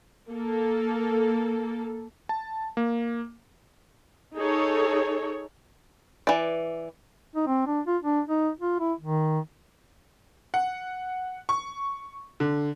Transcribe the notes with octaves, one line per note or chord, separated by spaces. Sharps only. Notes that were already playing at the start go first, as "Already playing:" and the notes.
A#3 A4
A5
A#3
D#4 G#4 A4 C#5
E3 D5
D#4
C4
D4
F4
D4
D#4
F4
E4
D#3
F#5
C#6
D3